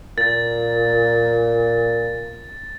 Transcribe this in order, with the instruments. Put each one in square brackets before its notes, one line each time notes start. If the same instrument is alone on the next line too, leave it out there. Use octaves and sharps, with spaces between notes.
[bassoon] A#2 [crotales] A6